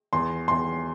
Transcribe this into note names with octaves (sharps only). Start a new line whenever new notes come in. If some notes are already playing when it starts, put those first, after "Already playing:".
E2 C6
E2 C6